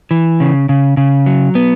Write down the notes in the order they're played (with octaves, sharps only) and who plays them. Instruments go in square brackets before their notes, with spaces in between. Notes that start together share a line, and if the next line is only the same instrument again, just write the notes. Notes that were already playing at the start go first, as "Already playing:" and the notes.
[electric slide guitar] E3
C#3
C#3
C#3
F#3
B3